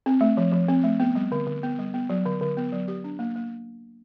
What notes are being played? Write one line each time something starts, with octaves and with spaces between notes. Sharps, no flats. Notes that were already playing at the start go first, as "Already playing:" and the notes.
C4
A3
F3
F3
C4
A3
B3
G3
D3
D3
B3
G3
B3
F#3
D3
D3
B3
F#3
G4
D4
A#3
A#3